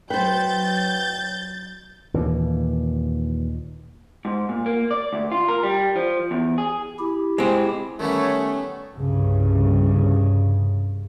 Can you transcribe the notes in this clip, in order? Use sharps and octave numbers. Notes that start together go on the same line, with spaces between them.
F#3 B4 C5 G5 G6 A6
D#2 A#2 E3
G#2
A#2
A#3
D5
D2
F4
A#4
G3
F3
E2
G#4
E4 G4
G#3 C4
D#3 G3 A3 B3 C#4 C#5
C2 G2 C#3